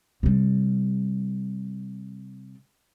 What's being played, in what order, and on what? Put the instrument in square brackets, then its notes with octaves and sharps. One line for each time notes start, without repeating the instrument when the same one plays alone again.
[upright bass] C3 G3